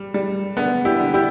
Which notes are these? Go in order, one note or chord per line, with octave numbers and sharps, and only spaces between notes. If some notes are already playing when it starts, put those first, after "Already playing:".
Already playing: G3
G3
D3 B3
E4 G4
D3
E4 G4